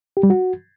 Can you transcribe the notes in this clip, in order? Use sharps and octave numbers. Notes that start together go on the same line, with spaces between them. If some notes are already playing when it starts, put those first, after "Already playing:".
G4
G3
F#4